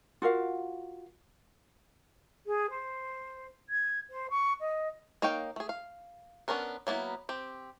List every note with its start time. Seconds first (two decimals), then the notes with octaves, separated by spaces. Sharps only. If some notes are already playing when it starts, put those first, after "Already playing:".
0.22 F4 F#4 A#4 F5
2.46 G#4
2.70 C5
3.69 G#6
4.10 C5
4.30 C#6
4.60 D#5
5.22 A#3 D#4 C#5 F5 G5
5.56 A3 G#4
5.69 F5
6.48 B3 C#4 D4 A#4 B4
6.87 F#3 A#3 B3 E4
7.29 C4 G4